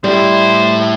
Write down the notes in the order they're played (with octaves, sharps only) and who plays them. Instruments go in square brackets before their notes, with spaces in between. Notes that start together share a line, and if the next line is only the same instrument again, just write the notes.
[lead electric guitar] A2 E4 [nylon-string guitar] G3 [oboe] C5